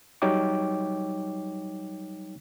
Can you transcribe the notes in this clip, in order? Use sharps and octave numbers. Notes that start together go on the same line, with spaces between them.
F#3 G3 D#4 C#5 G5 D6